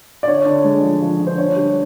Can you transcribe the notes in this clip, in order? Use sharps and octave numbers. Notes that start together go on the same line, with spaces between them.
D5
D3 C#5
D3
G#3
F3
F3
D3
C5
D3 C#5
G3